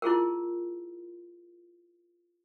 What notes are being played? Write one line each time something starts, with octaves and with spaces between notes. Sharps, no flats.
E4 F4 G#4 A#4